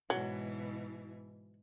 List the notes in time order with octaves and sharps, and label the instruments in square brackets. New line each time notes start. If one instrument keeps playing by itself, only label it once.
[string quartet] G#2 B2 E3 [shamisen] F#3